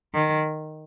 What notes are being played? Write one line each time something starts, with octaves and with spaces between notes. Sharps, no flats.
D#3